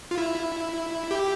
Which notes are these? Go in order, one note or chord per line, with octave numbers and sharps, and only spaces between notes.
F4
E4
G4